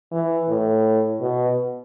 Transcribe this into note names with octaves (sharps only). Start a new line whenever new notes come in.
E3
A2
B2